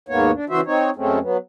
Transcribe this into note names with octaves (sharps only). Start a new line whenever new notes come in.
D#2 G#2 A#3 B3 C#5
D4
C#3 E3 F#4 C5 E5
C4 D#4 C#5
F#2 G#3 A3 C4 C#4
F#3 B3